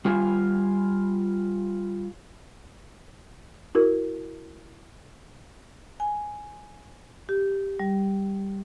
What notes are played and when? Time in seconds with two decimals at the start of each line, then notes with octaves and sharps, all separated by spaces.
0.05 G3 F4 G#5
3.75 E4 F#4 A#4
6.00 G#5
7.29 G4
7.79 G3